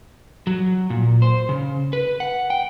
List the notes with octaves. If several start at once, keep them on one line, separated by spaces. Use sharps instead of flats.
F#3
A#2
C5
C#3
B4
F#5
G5